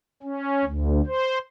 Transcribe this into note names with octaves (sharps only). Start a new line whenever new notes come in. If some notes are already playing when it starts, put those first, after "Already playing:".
C#4
D2
C5